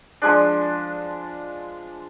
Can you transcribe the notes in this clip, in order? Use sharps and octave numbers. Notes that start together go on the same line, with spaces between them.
F3 G#3 D4